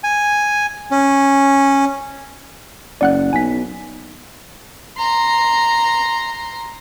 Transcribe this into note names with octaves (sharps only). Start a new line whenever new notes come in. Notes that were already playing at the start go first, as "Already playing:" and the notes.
G#5
C#4
F#1 D5 F#5 F#6
B1 G#5 B6
A#5 C6